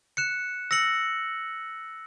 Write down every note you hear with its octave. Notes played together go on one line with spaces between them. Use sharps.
F#6 C#7 E7
E6 A#6 C#7 F#7